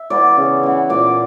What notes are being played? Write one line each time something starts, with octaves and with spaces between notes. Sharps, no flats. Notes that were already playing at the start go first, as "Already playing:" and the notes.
Already playing: E5
E3 B3 D5
C#3
E3 B3
A#2 D5